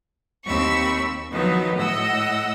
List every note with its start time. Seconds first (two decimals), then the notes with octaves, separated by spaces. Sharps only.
0.45 D#2 C4 B5 C#6 E6
1.31 D#3 F3 F#3 B3 B4
1.75 A2 D#5 F#5 E6